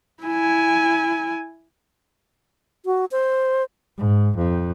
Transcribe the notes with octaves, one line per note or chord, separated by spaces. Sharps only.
E4 G#5
F#4
C5
G#2
F2